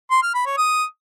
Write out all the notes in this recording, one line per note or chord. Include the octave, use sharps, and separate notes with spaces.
C6
F6
B5
C#5
D#6